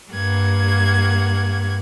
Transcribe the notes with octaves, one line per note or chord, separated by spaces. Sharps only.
G2 A#3 F#5 G#6